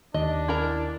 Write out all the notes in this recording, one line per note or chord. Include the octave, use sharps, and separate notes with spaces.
D#2 D4 D#5
E4 A#4 A#5